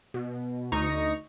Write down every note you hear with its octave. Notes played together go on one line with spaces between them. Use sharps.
B2
D2 D#4 A#5 C#6